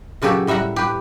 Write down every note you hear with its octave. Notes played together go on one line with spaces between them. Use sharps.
A#2 C#3 F#3 G4 A4
A2 G3 E5 F#5 A#5
G4 B4